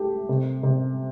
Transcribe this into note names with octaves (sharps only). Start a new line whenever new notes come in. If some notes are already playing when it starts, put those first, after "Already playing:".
Already playing: A3 G4
C3
C3